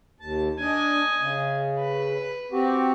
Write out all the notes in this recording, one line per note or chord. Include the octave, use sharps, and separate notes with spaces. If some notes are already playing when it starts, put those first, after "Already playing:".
D#2 A5
D4 D#5 G#5
C#3
B4
C4 F#4 G4